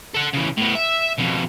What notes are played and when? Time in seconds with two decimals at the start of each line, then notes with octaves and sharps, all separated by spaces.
0.14 A4 F#5
0.33 C#3 E3
0.57 A2 B3
0.75 E5
1.18 F2 B2